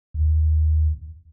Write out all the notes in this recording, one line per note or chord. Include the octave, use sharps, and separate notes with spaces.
D#2